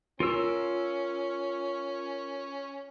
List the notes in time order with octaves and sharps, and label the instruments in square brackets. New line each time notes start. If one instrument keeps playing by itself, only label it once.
[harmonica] C#4 [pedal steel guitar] F4 A#4 E6